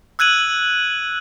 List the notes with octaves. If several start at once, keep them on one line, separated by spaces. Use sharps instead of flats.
E6 F#6 G#6 D#7 F#7